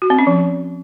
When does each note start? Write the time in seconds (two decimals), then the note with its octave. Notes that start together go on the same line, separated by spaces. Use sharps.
0.02 F#4
0.10 C4
0.18 C#4
0.27 F3